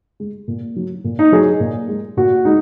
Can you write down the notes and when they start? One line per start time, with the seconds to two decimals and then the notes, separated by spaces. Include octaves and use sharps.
0.20 G#3
0.48 A#2
0.76 F#3
1.04 A#2
1.19 D#4
1.32 F#3 G#4
1.60 A#2
1.89 G#3
2.17 A#2 F#4
2.45 G#3 D#4